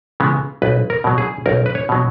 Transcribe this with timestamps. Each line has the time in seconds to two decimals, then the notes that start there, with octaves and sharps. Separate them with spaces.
0.20 C#3 E3 G#3 B3
0.62 B1 B4
0.90 A#4
1.04 B2 F#3
1.18 G#4
1.46 B1 A#4
1.66 B4
1.75 C#5
1.89 B2 F#3